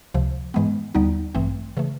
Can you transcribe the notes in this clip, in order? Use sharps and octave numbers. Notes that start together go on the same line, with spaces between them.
C#2 C3 F3
G#2 E3 G#3 B3
D#2 D3 G3 B3 D#4
A1 G2 E3 A3 C4
C#3 E3 A3